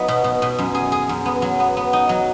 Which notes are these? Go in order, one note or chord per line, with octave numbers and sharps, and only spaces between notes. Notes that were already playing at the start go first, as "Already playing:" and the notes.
Already playing: F#3 B3 D#4
B2
B2
B2
F#2
G#4
G#4
F#2
B3
F#3
B3
B3
D#4
F#3